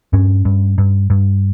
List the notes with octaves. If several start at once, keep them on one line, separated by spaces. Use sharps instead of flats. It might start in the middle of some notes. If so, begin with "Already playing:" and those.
G2 C#4
G2
G2
G2